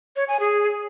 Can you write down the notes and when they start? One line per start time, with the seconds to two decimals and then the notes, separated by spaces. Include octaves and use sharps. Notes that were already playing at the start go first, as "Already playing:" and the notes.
0.16 C#5
0.28 G#5
0.40 G#4